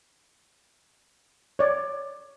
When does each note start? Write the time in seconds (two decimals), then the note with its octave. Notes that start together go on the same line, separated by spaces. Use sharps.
1.59 C#5 D5